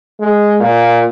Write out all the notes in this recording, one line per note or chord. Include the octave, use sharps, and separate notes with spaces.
G#3
A#2